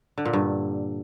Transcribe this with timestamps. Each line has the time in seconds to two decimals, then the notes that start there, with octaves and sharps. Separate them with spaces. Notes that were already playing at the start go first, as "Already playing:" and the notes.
0.18 D3
0.25 A#2
0.33 G2